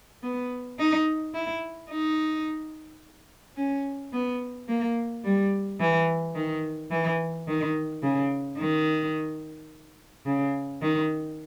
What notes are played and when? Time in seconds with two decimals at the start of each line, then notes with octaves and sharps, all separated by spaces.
0.23 B3
0.79 D#4
1.35 E4
1.91 D#4
3.57 C#4
4.13 B3
4.68 A#3
5.24 G3
5.80 E3
6.35 D#3
6.91 E3
7.47 D#3
8.02 C#3
8.58 D#3
10.26 C#3
10.82 D#3